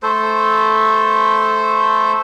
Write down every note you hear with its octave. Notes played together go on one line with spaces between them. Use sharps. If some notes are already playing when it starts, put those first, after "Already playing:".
A3 A4 C5